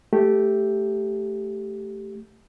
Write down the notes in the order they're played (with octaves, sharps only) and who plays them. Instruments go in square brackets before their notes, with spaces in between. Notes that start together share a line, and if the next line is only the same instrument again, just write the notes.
[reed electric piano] A3 G4